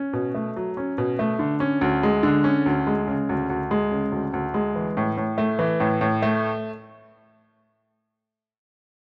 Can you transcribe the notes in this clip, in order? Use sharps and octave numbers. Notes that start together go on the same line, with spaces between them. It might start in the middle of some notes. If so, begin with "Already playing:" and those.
Already playing: C#4
B2
A3
F#3
C#4
B2
A3
D3
C#4
D2
G#3
D3
C#4
D2
G#3
C#3
D2
D2
G#3
C#3
D2
D2
G#3
E3
A2
A2
A3
E3
A2
A2
A3